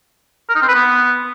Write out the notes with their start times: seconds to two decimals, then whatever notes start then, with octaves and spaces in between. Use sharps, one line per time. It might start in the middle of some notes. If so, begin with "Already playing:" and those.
0.49 A#4
0.55 D#4
0.62 C4
0.68 B4
0.74 B3